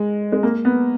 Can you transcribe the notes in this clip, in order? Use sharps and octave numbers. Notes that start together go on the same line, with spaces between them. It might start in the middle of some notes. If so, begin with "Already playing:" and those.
Already playing: G#3
G#3
A#3
B3